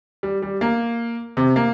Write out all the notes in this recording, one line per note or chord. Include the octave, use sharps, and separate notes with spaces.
G3
G3
A#3
C3
A#3